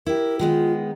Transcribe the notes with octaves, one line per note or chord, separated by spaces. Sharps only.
E4 G4 A#4
D#3 G#3 B3 F4